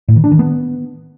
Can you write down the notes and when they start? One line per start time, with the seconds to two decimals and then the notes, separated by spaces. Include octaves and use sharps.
0.08 A2
0.16 D#3
0.24 D4
0.32 D#3
0.39 B3